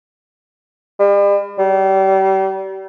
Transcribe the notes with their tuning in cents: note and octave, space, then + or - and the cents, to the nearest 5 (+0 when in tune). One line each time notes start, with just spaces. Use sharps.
G3 +40
G3 -35